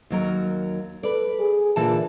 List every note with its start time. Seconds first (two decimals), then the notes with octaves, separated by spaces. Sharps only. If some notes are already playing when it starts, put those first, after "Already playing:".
0.10 D#2 F#3 A#4
1.03 A4 B4 D5
1.39 G#4
1.76 A#2 D3 E3 A5